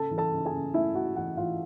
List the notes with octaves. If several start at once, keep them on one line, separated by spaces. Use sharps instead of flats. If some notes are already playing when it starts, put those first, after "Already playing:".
Already playing: C#3 A4 A5
E3
A4 A5
C#3
G#4 G#5
C#3
A3 E4 E5
A3 F#4 F#5
E3 F#4 F#5
E3 F4 F5